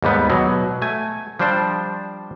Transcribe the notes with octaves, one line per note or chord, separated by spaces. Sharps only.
D#2 G#2 G3 B3
B2 F#3
A3 G#5
F3 G3 D4 C5 D5